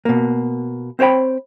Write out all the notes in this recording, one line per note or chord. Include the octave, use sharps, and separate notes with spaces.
B2 A#3
C4 C5 C#5 G5 B5